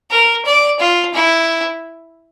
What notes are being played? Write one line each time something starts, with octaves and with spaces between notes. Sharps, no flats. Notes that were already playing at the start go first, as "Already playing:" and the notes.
A#4
D5
F4
E4